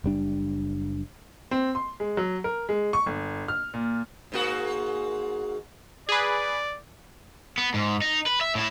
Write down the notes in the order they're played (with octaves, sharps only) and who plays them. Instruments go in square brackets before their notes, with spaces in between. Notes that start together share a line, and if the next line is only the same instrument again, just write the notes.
[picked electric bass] F#1 G3 D4
[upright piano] C4
C6
G#3
F#3
A#4
G#3
C#6
G1
F6
A#2
[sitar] G#2 A#3 F#4
[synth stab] G#4 B4 [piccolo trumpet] D5
[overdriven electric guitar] B3
G#2
D#4
B4
E5
A2 E4